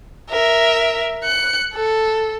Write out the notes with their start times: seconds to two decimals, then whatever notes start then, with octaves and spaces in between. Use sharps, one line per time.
0.30 A#4 E5
1.24 F#6 C#7
1.74 A4